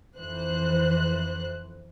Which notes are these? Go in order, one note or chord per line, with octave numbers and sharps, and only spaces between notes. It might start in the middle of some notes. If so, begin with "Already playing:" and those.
F2 E3 C5 F#6